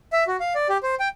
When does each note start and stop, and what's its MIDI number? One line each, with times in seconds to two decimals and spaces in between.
0.13 0.24 76
0.27 0.37 66
0.40 0.53 77
0.55 0.68 74
0.69 0.77 67
0.83 0.95 72
1.00 1.08 79